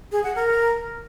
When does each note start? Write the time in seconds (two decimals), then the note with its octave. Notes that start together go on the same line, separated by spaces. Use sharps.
0.12 G#4
0.24 F#5
0.35 A#4